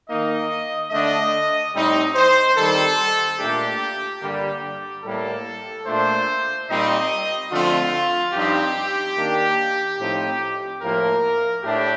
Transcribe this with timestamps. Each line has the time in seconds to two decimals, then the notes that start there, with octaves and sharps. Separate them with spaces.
0.08 D#3 A#3 D#4 D#5
0.91 D3 A3 D4 D#5
1.73 A2 G3 C4 D#4
2.15 C5
2.56 D#3 G3 C4 A4
3.38 A#2 A3 D4 G4
4.21 G2 D3 G3 A#3 D4 G4
5.03 A2 G3 A#3 A4
5.86 A#2 A3 D4 C5
6.68 A#2 G3 C4 D#4 D#5
7.51 D3 F3 A3 C4 F4
8.34 G2 F3 C4 D#4 G4
9.16 D#3 A#3 D4
9.98 A2 F3 C4 D#4
10.82 A2 F3 A#3 A#4
11.64 A2 A3 D4 G4